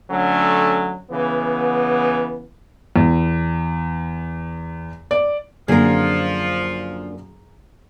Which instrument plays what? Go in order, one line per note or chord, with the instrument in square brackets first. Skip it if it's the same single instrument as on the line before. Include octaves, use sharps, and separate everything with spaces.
[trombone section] D3 F#3 A3 C#4
C#3 E3 B3
[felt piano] E2
D5
[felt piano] F#2 D3 C4 [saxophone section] F3 [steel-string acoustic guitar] A#3 D4 [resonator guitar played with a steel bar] G#4 A#4